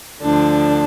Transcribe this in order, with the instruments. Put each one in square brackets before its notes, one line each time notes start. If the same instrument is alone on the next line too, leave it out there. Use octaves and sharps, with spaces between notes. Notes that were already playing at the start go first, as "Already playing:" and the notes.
[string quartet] D2 D3 F3 D4